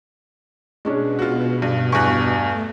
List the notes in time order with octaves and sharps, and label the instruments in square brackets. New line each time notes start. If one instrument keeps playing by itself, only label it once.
[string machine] B2 [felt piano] G#3 C#4 D4
[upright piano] F4 F#4
G2
[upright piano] E2 G2 [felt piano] C#6 F#6
[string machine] A3